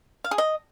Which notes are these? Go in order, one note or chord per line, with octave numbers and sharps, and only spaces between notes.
F5
G#4
D#5